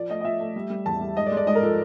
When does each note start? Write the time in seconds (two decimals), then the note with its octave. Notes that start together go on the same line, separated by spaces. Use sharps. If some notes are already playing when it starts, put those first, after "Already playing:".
Already playing: F3 D5
0.09 A3 D#5
0.20 D#5
0.24 F3 E5
0.40 A3
0.56 G3
0.70 G3
0.86 E2 A5
1.01 G3
1.17 G#2 D#5
1.26 D5
1.32 G#3
1.37 D5
1.47 G#2 D#5
1.55 A#4
1.62 F3 A4